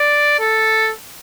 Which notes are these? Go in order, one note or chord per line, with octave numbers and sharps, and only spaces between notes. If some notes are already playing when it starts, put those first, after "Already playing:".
Already playing: D5
A4